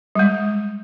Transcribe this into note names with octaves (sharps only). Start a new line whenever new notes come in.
G3 G#3